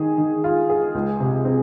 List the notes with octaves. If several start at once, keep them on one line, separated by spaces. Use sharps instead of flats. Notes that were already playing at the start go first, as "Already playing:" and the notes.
Already playing: D#3 G#4
D#3
F4
G#4
C#2
C3
C4